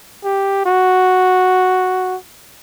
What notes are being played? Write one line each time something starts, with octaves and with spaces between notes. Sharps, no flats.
G4
F#4